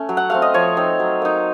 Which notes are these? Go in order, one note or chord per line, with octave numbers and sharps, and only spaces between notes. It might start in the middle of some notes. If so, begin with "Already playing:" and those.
Already playing: A3 C#4
F#3
F#5
A3 C4 F5
D#5
F3 C#5
C4 D#4
F#3
A#3 D#4